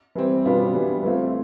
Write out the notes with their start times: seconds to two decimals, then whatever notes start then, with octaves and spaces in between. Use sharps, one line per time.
0.15 E3 G3 C4
0.45 B2 G3 B3 D4 F4
0.73 E3 G3 B3
1.03 E3 A3 C4 F4